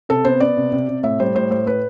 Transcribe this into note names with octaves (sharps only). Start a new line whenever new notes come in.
C3 A4
B3 C5
B3 D5
C3
C3
C3
A2 E5
G3 C5
A2 C5
A2 C5
A2 B4